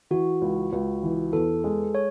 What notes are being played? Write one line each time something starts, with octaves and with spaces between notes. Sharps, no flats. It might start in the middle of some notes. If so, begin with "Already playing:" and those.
E3 F#4
C#2
C#2
E3
E2 A4
G#3
C#5